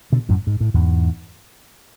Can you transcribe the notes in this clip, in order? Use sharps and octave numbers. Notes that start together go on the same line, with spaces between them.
B2 D3
F#2 A2
G#2
A2
E2 G#2